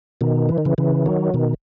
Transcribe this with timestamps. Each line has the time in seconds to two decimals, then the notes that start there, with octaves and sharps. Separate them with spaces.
0.21 B2 D#3
0.49 E3
0.58 D#3
0.65 C#3 E3
0.78 C#3 E3
1.06 D#3 F#3
1.34 B2 D#3